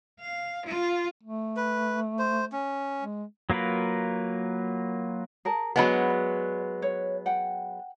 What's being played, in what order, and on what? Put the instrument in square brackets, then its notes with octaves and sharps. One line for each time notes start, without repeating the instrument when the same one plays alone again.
[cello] F5
F4
[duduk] A3
[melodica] B4
C5
C#4
[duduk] G#3
[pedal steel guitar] F#3 A#3 F4 A#4 B4
[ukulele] G#4 A#4 A5
[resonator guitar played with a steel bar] F#3 G#3 B3 [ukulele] D4 F#4 B5
[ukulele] D5
C#5
F#5 G5